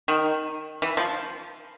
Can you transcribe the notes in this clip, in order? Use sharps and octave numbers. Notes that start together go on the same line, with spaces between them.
D#3
E3
F3